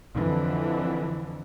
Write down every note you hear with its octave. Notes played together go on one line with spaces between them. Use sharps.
F2 D3 E3